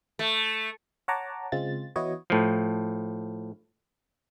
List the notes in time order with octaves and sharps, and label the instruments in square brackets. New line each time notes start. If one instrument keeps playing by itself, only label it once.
[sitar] A3
[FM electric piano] C#5 F#5 A5 A#5 D6
C#3 G#3 C4 F4 A6
E3 B3 E4 F#4 C#5 D#5
[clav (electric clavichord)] A2 F3